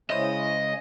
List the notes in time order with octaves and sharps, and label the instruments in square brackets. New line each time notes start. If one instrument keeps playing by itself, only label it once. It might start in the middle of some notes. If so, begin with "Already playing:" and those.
[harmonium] C#3 G#3 [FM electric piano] E4 C5 C#5 [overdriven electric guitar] D#5